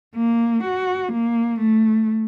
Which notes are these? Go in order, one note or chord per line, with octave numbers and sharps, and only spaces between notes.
A#3
F#4
A#3
A3